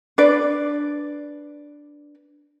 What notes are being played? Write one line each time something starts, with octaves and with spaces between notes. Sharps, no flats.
D4 B4 D5